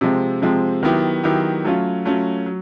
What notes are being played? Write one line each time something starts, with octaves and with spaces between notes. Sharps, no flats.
C3 F3 G#3 C4
C3 F3 G#3 C4
D#3 F#3 B3 E4 G4
D#3 F#3 B3 E4 G4
F#3 A3 C#4 F4
F#3 A3 C#4 F4
F#3